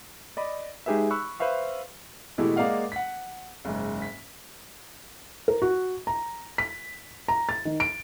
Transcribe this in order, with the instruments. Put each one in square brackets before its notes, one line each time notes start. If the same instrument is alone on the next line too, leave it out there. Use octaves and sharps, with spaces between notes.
[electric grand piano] D5 D#5 B5
G#3 D#4 G4 G#4 B4 E5
B5 C#6 E6 F#6
B4 C5 E5 F5 C#6
[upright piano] B2 E3 G#3 A3 E4 G4
G#3 A#3 D5 D#5 F5 F#5
F#5 B6
F#1 G#2
B6
[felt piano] A#4
F#4
A#5
B6
A#5
A6
D#3
D7